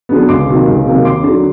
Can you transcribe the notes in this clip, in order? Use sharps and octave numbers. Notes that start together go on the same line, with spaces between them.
D3 F#3 B3
C#2 C6 D6
C3 D#3 F#3 A#3
C#2
C3 D#3 F#3 A#3
D#2 C6 D6
D3 F#3